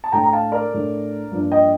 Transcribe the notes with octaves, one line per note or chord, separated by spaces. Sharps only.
A5
A2 A3 D4 G5 A#5
A#5
F5 A5
A#4 D5
A2 A3 D4
G2 F3 A#3 D4
D#5 G5